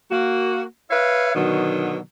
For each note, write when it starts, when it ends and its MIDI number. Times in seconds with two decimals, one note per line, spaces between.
0.11 0.63 58
0.11 0.63 66
0.90 1.35 71
0.90 1.35 73
0.90 1.35 76
0.90 1.35 77
1.35 1.99 47
1.35 1.99 50
1.35 1.99 51
1.35 1.99 54